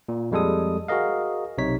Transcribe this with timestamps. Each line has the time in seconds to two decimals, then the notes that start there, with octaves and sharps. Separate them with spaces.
0.09 A#2
0.32 F2 G3 G#3 A4 D#6
0.88 F#4 G#4 A#4 D#5 F5
1.58 B1 C3 D#4 C#5 B6